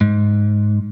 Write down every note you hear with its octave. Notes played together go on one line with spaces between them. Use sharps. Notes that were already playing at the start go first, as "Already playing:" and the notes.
G#2